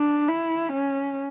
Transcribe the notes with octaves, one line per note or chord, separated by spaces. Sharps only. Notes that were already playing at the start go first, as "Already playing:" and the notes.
Already playing: D4
E4
C#4